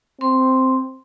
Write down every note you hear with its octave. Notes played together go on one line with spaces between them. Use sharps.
C4 C6